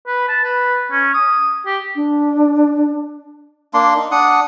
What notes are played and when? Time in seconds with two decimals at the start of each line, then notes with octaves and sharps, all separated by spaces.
0.07 B4
0.28 A5
0.44 B4
0.91 C#4
1.14 D#6
1.66 G4
1.95 D4
3.74 A#3 D4 C6
3.96 D#4
4.11 D4 F#5 D#6